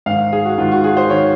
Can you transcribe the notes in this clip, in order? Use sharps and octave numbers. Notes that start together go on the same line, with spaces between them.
G#2 D#3 F5
G#4
F#4
G#2 D#3 F4
F#4
G#4
C5
D#3 C#5